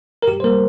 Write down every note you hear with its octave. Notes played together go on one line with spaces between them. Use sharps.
A#4
G2 G4
C5
G3 A#3 A#4